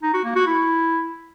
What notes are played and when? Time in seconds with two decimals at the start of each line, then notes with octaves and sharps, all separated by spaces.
0.03 D#4
0.14 F#4
0.25 A#3
0.36 F#4
0.47 E4